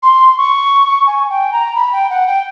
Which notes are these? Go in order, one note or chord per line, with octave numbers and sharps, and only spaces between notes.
C6
C#6
G#5
G5
A#5
B5
G5
F#5
G5